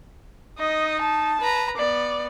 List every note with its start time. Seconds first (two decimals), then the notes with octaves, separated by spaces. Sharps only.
0.59 D#4 D#5
1.01 A5
1.40 B4 A#5
1.77 B3 D5